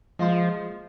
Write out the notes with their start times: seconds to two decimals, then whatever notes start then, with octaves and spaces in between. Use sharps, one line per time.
0.19 F3 G#3 F4 C5